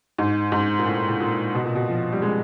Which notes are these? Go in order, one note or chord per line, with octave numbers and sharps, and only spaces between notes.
G#2
G#2
A#2
A2
A2
A#2
B2
A#2
B2
F3
G3
G#3